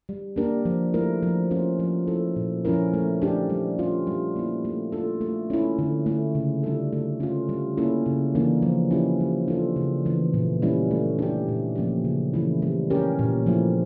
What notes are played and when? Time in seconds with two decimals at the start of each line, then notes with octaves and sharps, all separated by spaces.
0.09 G3
0.36 A#3 D4 G4 A#4
0.65 F3
0.94 A3 E4 A#4
1.23 F3
1.51 C#4 F4 A#4
1.79 F3
2.07 C#4 E4 A4
2.36 A#2
2.65 F3 C#4 E4 A#4
2.94 A3
3.22 D4 G4
3.50 G3
3.79 C#4 F4
4.07 G3
4.36 A#3 E4
4.65 A3
4.92 D4 F4 A4
5.21 A3
5.50 C#4 E4
5.79 D3
6.06 A3 E4
6.35 C#3
6.63 G3 D4 F4 A4
6.93 A3
7.20 C#4 F4
7.49 G3
7.77 A#3 C#4 E4 A4
8.06 C#3
8.35 E3 A#3 D4
8.62 F3
8.91 C#4 E4 G4
9.20 G3
9.48 D4 F4 A4
9.76 C#3
10.05 E3 A3
10.34 A#2
10.62 G3 C#4 E4
10.91 A3
11.19 D4 G4
11.48 A#2
11.76 F3 A#3 C#4 G4
12.04 C#3
12.34 E3 A3 C#4 E4
12.62 G3
12.90 C#4 G4 A#4
13.19 A#2
13.46 F3 A3 E4